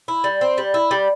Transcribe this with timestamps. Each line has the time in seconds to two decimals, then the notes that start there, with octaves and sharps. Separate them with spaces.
0.08 E4
0.24 G3
0.41 C4
0.58 G3
0.74 E4
0.91 G3